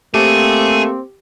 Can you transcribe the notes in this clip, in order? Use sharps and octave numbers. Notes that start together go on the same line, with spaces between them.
A3 A#3 C4 G4 G#4